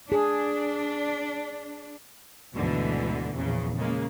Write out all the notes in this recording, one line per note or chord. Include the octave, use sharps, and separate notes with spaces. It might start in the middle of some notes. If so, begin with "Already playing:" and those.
D4 G#4
D2 G#2 B2 D3 E3
A#1 E2 C#3
C#3 G#3 A#3